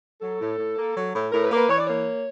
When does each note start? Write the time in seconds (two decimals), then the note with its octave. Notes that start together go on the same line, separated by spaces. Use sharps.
0.22 F#3 A4
0.39 A2
0.58 A2
0.77 A#3
0.95 F#3
1.14 A2
1.33 A2 A#4
1.44 B4
1.51 A#3
1.57 B4
1.69 E3 C#5
1.79 D5
1.87 A#3 C#5